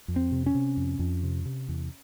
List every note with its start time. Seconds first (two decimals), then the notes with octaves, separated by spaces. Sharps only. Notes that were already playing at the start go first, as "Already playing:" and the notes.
0.08 F2
0.16 C4
0.32 C3
0.46 C#4
0.55 C3
0.77 F2
0.99 F2
1.23 C3
1.45 C3
1.69 E2